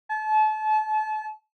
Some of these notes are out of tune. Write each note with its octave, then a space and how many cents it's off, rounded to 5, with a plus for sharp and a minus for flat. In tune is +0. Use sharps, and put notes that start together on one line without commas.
A5 -35